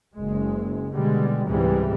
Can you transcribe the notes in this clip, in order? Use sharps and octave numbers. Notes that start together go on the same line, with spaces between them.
F#1 G#3
B2 D3 G3 G#3
C#2 G#2 C3 E3 G3 G#3